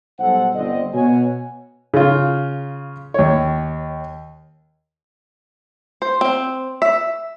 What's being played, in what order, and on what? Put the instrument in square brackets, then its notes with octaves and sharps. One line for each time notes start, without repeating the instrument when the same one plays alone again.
[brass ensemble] B1 G3 A4 C5 F#5
G1 G2 C4 D5 D#5
B2 F#4 C#5 G#5
[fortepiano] C#3 F4
D#2 C#5
[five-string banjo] C5
C4
E5